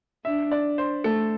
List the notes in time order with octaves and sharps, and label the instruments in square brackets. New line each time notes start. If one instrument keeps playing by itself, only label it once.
[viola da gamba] D4 [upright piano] E5
[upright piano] D5
C5
[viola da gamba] A3 [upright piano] A4